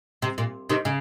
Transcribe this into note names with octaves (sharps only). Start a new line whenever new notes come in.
C3
A#2
C3 D#3
C#3